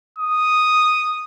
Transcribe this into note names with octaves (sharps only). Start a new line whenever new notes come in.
D#6